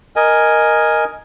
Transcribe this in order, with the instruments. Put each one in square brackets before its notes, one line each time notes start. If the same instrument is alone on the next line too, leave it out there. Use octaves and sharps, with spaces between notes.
[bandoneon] A#4 D#5 G#5